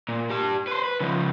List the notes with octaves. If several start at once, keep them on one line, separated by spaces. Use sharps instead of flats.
A#2
G4 A5
B4 C5
B4
C#3 F3